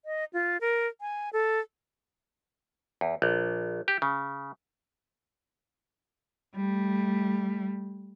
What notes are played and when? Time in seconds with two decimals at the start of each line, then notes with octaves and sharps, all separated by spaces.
0.05 D#5
0.33 F4
0.61 A#4
1.01 G#5
1.33 A4
3.01 E2
3.22 A#1
3.88 G4
4.02 C#3
6.56 G3 A3